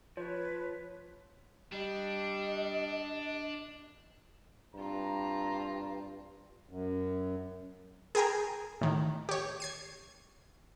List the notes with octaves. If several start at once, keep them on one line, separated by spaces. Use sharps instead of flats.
F3 B4 C#5
G3 D4 D#5
G2 C4 F4 A#5
F#2
G#4 A#4 G5 G#5 A#5
A2 D#3
G4 C#5
G#6 C7 D#7